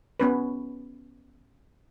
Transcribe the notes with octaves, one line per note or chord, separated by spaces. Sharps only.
B3 C#4 B4